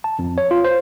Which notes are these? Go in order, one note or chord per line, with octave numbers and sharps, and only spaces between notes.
A5
F2
C#5
F4
C5